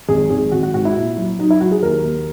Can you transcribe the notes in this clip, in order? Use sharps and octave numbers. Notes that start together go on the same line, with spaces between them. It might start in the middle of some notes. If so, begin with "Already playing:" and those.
G#1 G#4
G#1 G#4
G#1 F#4
F#4
G#2 F#4
E4
A#2
F#3
F#3 D#4
E4
F#3 F#4
G#4
D#2 A#4
D#2